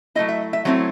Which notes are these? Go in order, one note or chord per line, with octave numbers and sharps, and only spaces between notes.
F#3 A3 C4 E4 D#5
E5
E5
F#3 A3 C4 E4 C#5